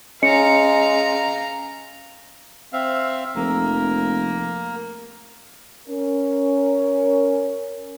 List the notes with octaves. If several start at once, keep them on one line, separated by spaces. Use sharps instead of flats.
G#3 C#4 F5 A#5 C#7
C4 E5 F5
F1 A#3 A#4
C#4 A#4